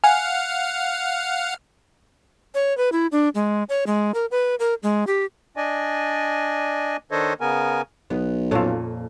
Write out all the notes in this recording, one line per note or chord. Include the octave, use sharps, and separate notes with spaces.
F5 F#5 G#5 F6
C#5
B4
E4
D4
G#3
C#5
G#3
A#4
B4
A#4
G#3
G4
D4 D5 D#5 G#5
D#3 D4 A4 C5 C#5 D#5
C#3 B3 A#4 G#5
B1 B3
F2 A#2 C#4 F4 A4